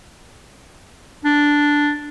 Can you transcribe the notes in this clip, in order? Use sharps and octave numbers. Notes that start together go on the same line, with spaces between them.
D4